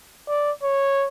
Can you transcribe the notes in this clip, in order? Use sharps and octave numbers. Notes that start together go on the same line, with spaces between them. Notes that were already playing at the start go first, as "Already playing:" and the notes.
D5
C#5